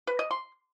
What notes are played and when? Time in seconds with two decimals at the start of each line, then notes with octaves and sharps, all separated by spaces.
0.07 B4
0.19 D#5
0.31 C6